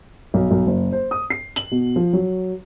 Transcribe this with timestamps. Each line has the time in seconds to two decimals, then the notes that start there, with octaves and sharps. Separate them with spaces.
0.34 B1
0.51 B1
0.67 F#1
0.92 C5
1.11 D#6
1.30 C7
1.56 F#7
1.71 B2
1.96 F3
2.13 F#3